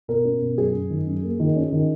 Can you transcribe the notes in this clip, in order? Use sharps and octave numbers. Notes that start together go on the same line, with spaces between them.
B2 A#4
C#4
B2
F#2 G#4
F#2
D#3
F#2
A#3
D#3
C#4
D#3